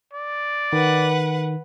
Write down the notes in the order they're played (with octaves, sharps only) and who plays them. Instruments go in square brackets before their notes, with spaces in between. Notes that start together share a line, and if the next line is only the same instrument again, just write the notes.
[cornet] D5
[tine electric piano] D#3 [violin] B4 F#5